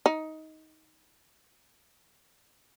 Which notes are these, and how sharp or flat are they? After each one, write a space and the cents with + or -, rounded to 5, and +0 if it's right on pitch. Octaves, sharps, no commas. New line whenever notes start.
D#4 +15